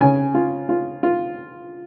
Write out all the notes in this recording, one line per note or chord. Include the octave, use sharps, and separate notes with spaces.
C#3 G#5
F4
F4
F4